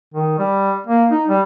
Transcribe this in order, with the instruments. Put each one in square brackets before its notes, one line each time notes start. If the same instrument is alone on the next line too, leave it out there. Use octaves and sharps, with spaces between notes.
[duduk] D#3
G3
A#3
D#4
G3